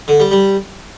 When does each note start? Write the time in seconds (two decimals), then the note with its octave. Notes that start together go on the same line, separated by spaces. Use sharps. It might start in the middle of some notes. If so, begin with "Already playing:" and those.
0.08 D3
0.20 G3
0.32 G3